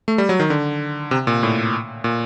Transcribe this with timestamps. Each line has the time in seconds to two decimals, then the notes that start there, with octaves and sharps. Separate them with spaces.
0.08 A3
0.18 G3
0.29 F#3
0.40 D#3
0.50 D3
1.11 C3
1.27 A#2
1.43 A2
2.04 A#2